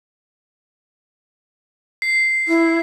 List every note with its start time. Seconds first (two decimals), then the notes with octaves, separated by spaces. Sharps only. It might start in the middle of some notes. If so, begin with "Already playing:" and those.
2.02 C7
2.48 E4